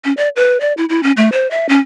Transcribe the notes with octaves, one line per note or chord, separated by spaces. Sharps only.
C#4
D5
B4
D5
E4
E4
C#4
A3
C5
E5
C#4